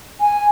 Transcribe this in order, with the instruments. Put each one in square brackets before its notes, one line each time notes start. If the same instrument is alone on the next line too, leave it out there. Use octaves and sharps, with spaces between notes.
[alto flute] G#5